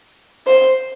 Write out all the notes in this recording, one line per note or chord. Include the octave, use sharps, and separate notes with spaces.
C5